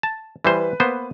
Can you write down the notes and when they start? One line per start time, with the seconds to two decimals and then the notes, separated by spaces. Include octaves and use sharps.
0.03 A5
0.45 E3 G3 B4 C5
0.80 A#3 B3 C5